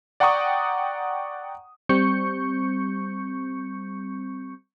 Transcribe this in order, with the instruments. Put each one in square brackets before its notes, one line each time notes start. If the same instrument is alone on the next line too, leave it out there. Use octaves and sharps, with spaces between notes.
[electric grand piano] D5 F#5 G5 A#5 C#6 D#6
[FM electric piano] G3 C4 C#6 G6 C#7